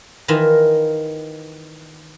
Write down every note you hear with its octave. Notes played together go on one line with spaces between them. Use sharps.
D#3 E3 F4 D#5 E5